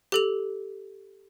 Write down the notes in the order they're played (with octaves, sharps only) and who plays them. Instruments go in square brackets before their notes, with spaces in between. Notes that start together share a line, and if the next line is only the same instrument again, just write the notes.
[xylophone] G4 A4 F7